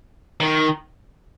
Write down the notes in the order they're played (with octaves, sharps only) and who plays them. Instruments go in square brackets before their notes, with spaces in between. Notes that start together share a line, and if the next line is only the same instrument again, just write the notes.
[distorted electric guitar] D#3